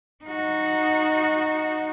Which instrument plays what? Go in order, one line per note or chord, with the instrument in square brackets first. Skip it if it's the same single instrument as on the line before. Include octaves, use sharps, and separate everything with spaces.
[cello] D#4 F#4